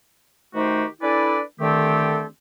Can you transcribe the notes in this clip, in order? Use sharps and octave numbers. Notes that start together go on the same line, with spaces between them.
D#3 A3 D#4 F#4 G4 C5
D4 E4 A4 B4 D5 G#5
D3 D#3 A3 C4 G4 A4